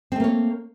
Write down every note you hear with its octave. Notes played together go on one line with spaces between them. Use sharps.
A3 A#3 C4 C#5